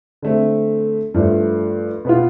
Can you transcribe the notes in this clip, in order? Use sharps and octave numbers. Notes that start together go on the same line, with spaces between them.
D3 A3 C4
G2 F3 A3
B2 B3 F4